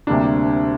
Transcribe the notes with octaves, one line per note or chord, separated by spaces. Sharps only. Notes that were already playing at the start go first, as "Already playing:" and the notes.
D2 C3 G3 A#3 D4